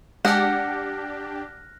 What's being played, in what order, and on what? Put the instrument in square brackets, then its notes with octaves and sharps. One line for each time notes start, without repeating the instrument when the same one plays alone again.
[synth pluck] G#3 [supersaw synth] D4 G4 [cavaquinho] F#5 [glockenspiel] F6 F#6 A#6